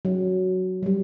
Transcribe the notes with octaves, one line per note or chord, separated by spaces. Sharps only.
F#3
F#3
G3